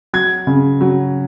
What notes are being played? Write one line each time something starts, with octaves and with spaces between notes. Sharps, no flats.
F#3 G#6
C#3
F#3